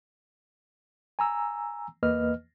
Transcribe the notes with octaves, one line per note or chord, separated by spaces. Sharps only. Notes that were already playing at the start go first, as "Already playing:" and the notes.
G#5 A#5 E6
E2 A#3 B4 D#5 F6